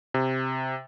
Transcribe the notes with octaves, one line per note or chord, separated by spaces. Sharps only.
C3